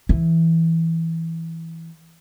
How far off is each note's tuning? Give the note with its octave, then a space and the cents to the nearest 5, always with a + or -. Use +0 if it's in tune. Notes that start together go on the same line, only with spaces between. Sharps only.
E3 -5